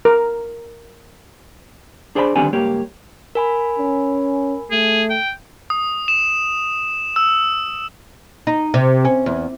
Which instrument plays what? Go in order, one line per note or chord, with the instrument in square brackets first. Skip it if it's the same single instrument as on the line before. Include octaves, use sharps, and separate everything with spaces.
[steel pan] A#4
[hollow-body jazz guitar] D4 G#4 C5 D5 G#5 B5
D3 D#3 G3 B3 C4 G#5
C#2 G2 A#3 G4 C#5
[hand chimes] A#4 G#5 B5
[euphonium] C#4
[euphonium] A3 [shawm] G#4
[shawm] G5
[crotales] D#6
E7
E6
[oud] D#4
C3
C#4
E2